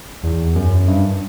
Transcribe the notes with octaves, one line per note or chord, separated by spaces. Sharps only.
E2
F#2
G2